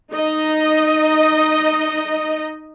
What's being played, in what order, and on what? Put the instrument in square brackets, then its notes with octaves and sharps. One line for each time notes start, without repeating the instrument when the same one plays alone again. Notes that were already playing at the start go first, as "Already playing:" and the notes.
[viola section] D#4 D#5